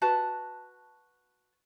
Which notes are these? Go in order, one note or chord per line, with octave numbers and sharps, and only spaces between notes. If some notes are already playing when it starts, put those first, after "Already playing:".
F#4 B4 A5